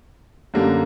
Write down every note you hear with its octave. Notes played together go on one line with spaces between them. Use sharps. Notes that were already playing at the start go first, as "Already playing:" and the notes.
F#2 D3 G3 A#3